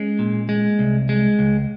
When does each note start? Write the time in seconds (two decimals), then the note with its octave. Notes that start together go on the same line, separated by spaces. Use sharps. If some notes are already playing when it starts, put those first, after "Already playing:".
Already playing: G#3 C#4
0.19 A#2
0.49 G#3
0.79 C2
1.09 G#3
1.39 C#2